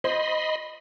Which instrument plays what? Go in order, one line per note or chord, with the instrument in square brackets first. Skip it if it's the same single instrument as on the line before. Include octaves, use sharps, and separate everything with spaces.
[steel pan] C5 [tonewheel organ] D#5 B5 C6